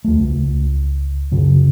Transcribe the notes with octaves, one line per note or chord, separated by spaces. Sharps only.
D#2 A3
C#2
F#2 C#3